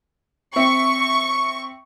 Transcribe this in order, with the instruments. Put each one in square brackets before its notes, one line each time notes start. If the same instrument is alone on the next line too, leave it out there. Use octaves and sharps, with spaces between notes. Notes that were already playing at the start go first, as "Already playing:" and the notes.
[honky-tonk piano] C4 E5 [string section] C#6